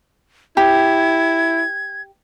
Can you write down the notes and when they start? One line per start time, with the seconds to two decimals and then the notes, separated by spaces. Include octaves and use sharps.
0.57 E4 G4 G#6